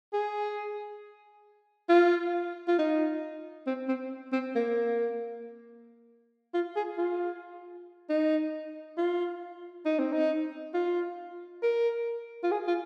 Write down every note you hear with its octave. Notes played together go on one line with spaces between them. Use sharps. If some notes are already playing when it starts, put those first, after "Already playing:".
G#4
F4
F4
D#4
C4
C4
C4
A#3
F4
G#4
F4
D#4
F4
D#4
C4
D#4
F4
A#4
F4
G#4
F4